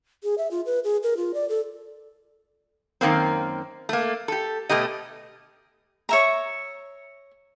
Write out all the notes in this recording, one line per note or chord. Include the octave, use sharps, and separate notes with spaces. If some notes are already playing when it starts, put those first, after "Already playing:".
G#4
E5
F4
B4
G#4
A#4
F4
D5
A4
F#2 D#3 A#3 C4
A3 A#3
G4 A4
B2 A3 G4 D#5
C#5 E5 A#5